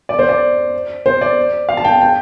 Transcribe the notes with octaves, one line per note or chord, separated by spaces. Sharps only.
D5
C5
D5
C5
D5
F5
A5
G5
G5